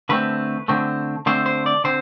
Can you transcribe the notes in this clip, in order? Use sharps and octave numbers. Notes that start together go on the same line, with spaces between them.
D3 A3 C4 B4
D3 A3 C4
D3 A3 C4 C5
C5
D5
D3 C4 C5